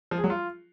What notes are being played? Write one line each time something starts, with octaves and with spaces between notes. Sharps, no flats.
F3
G#4
F#3
F4